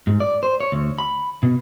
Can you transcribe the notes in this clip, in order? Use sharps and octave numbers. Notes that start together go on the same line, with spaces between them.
G#2
D5
C5
C#5
D2
B5
B2